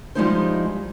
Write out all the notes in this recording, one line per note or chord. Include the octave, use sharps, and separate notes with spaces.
F3 G3 G#3 D#4 E4 C5